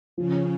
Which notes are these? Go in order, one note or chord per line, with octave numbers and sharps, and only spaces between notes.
C#3 F3 C#4